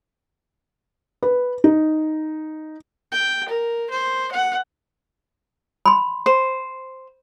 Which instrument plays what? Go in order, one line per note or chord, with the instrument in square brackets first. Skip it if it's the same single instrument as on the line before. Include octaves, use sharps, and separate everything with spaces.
[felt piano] B4
D#4
[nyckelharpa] G5
A#4
C5
F#5
[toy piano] B5 C6
[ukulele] C5